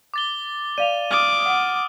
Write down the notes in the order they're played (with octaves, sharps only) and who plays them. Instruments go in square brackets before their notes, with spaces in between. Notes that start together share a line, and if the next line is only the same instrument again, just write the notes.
[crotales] D6 A6 G7
[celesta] D5 F5 F7 [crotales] D#7
[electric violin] D6 [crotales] D#6 F6
[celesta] F#5